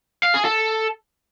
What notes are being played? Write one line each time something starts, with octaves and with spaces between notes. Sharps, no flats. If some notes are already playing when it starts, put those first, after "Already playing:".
F5
G#4
A4